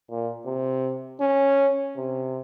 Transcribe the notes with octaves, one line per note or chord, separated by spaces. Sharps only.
A#2
C3
C#4
C3